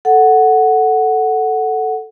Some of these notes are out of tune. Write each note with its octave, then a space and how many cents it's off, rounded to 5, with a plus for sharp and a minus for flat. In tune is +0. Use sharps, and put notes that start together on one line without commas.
A4 +0 F#5 +0